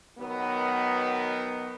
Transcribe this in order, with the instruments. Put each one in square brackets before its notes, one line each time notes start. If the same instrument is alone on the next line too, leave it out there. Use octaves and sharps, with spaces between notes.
[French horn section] B2 D#3 F#3 B3